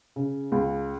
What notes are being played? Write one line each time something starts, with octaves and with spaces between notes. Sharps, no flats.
C#3
C#2